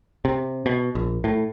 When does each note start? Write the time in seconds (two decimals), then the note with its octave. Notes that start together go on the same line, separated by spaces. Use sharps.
0.25 C3
0.66 B2
0.95 A#1
1.24 A2